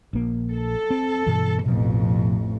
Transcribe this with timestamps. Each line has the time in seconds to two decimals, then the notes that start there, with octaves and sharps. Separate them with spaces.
0.13 A#1 A#3
0.53 A4
0.90 C4
1.26 G2 B2 E3
1.66 A1 F2 B2 F3